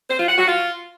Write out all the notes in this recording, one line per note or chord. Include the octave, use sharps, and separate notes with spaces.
C5
F4
F#5
F#4
F4